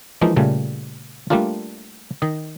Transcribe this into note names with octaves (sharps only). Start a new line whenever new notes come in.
E3 F3 G#3 A#3 D#4
A#2 C#3 G3 A3
G3 A3 A#3 D4 F4
D#3 D#5